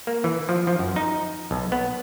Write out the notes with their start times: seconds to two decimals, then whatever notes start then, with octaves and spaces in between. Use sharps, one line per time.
0.07 A#3
0.24 E3
0.49 F3
0.67 F3
0.79 F#2
0.96 D#4
1.51 B1
1.72 B3